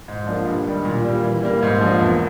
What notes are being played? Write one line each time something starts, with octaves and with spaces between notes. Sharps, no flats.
G#2
F3 A#3 D4
G2
D#3 G3
A#2
G3 A#3
E3
G3 A#3
G#2
F3 A#3 D4
E2